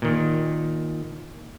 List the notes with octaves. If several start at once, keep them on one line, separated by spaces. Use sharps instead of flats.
A#2 D#3